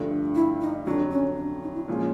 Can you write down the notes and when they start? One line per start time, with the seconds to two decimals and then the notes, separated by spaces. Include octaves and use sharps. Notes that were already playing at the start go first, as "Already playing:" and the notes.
Already playing: G2 D3 F3 A3
0.35 E4
0.61 D#4
0.86 F2 D3 F#3 D4
1.11 C#4
1.37 D4
1.63 D#4
1.75 E4
1.88 A#2 F3 G#3 C#4 F4